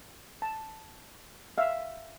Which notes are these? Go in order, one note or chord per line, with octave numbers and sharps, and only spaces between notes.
A5
E5 F5